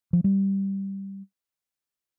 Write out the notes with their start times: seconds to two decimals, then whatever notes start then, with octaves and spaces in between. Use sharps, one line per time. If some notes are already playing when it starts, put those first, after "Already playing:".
0.13 F3
0.24 G3